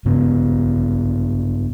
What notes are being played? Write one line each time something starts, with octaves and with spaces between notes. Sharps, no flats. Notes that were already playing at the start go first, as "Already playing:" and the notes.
G2 C#3 B3